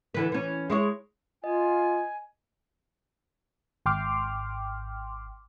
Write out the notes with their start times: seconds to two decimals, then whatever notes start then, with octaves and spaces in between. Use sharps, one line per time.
0.14 D3 E3 B4
0.32 E3 C#4
0.70 G#3 E4 C#5
1.44 F4 D#5 G#5
3.86 G#1 G5 C6 D6 F6